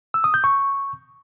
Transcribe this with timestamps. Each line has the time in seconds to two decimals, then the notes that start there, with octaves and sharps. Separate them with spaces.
0.14 E6
0.24 D#6
0.34 G6
0.44 C#6